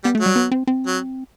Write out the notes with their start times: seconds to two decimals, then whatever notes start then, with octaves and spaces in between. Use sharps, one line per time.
0.04 G3 B3
0.15 A3
0.20 F#3
0.26 G3
0.36 B3
0.51 C4
0.67 C4
0.87 F#3